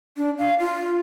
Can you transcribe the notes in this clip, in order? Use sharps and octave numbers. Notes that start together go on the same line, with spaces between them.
D4
F5
F4